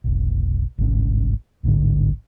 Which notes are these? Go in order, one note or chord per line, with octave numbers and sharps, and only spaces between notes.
F1 B1
G1 C2 G#2 C#4
D1 A1 G#2 D3